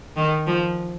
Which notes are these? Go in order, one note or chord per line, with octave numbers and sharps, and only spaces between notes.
D#3
F3